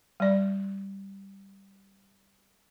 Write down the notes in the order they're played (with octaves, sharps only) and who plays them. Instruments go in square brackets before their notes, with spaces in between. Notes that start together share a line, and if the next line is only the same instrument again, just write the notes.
[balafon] G3 D5